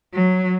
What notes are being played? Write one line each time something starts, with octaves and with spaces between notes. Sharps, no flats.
F#3